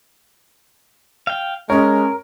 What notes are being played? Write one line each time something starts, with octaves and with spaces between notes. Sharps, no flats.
F5 G5
G#3 C#4 A#4 C#5